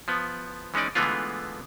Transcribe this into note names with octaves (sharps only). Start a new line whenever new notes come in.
F3 B3
E3 G#3 C#4 D#4 D5
D3 E3 G#3 A3 B3 F4